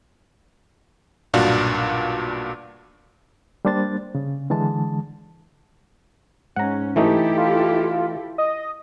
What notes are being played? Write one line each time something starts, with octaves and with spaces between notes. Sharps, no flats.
B1 G2 A#2 D4 F#4 F5
G3 A#3 D4 C5 A6
C#3
D3 E3 G#3 A5
G#2 C#4 F#5 A#5
E3 A3 D#4 E4 G4 A4
F4
D#5